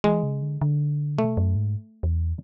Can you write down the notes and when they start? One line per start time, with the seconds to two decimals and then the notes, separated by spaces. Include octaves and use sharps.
0.04 E3 G#3
0.23 C#3
0.42 D3
0.61 D3
1.18 B2 A3
1.37 F#2
1.56 G#2
2.03 E2